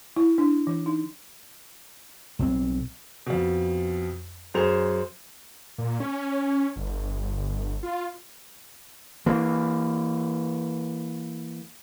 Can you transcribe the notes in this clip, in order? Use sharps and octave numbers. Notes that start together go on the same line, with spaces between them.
E4
D4
E3
D#4
B1 F#3 C4
F2 B2
F#2 G#4 C5 F7
A#2
C#4
G1
F4
E3 A#3